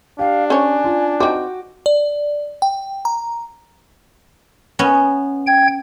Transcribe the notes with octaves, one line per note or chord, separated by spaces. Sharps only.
D4 G4 F5
C#4 C5 C#5 G#5
F4
C4 D#4 F#4 D6
D5
G5
A#5
B3 C#4 D#5
G5 G#6